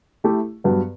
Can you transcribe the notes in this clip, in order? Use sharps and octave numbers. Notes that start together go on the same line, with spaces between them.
A3 E4 G4
G2 F#3 B3